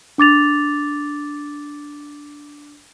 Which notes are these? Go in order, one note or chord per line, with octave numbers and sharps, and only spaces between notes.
D4 D6 A6 F7